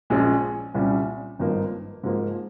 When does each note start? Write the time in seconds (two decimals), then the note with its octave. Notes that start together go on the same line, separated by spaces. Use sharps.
0.10 A#1 A#2 F3 G#3 C#4
0.74 C2 A#2 G3 C#4
1.39 G#1 G2 F3 A#3 D#4
2.03 G#2 F3 A#3